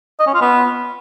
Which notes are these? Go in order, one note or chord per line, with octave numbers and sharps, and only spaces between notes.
D#5
C#4
F4
B3